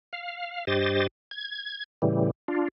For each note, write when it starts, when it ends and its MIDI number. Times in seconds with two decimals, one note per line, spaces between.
0.13 0.65 77
0.67 1.07 43
0.67 1.07 67
0.67 1.07 72
0.67 1.07 75
0.67 1.07 93
1.31 1.84 92
2.02 2.31 45
2.02 2.31 49
2.02 2.31 52
2.02 2.31 55
2.48 2.68 62
2.48 2.68 65